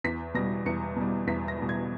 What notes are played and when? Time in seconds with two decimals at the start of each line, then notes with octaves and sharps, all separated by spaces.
0.04 E2 B6
0.34 B2 G3 A#6
0.66 E2 C#7
0.96 B2 G3
1.27 E2 B6
1.48 A#6
1.58 B2 G3
1.69 G#6